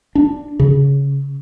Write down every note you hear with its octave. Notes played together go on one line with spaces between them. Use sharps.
D4
C#3